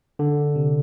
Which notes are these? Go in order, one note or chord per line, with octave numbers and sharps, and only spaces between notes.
D3
C3